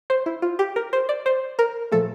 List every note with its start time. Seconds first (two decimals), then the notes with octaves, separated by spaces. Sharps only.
0.10 C5
0.26 E4
0.42 F4
0.59 G4
0.76 A#4
0.93 C5
1.09 D5
1.26 C5
1.59 A#4
1.92 A#2 F3 A3 A4